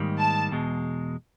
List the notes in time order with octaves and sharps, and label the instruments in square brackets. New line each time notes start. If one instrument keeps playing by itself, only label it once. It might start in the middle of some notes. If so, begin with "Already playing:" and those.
Already playing: [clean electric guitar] G#2 D#3 G3 A#3
[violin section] A5
[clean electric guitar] E2 B2 G#3